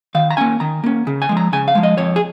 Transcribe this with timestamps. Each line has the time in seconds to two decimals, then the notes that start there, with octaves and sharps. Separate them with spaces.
0.15 D#3 F5
0.31 A#5
0.37 A#3 C#4 G#5
0.60 D#3 A#5
0.84 A#3 C#4
1.07 C#3
1.22 G#5
1.29 F3 G#3
1.37 A#5
1.53 C#3 G#5
1.68 F5
1.75 F3 G#3
1.83 D#5
1.98 F2 C#5
2.16 G#4